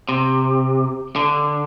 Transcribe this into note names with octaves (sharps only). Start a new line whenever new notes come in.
C3
D3